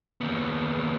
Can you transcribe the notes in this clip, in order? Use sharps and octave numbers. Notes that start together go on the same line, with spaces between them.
D#2 B3